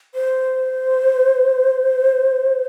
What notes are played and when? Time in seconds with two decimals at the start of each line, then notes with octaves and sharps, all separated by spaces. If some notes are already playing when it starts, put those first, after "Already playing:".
0.15 C5